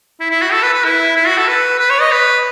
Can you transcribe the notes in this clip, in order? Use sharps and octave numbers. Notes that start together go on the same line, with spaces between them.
E4
E4
F#4
A4
B4
B4
E4
E4
F#4
A4
B4
B4
C#5
D#5
B4